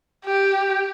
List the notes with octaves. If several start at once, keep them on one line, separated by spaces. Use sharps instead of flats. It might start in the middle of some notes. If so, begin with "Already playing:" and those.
G4